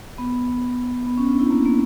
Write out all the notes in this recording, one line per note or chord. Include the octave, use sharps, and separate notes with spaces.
B3
B3
C#4
D4
E4
A#3
A#3